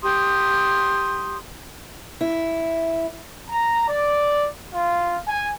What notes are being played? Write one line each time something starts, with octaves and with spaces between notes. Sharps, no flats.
G4 C6 D#6
E4
A#5
D5
F4
G#5